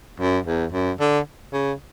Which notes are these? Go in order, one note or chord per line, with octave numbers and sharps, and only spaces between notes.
F#2
E2
F#2
D3
C#3